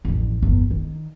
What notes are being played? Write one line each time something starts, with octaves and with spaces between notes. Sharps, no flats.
A1 F2
G1 E2
D#3